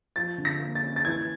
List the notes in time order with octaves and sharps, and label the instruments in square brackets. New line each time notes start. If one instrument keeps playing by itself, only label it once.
[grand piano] F3 A6
D3
A#6
A#3
A6
C#4
A6
E3 G#6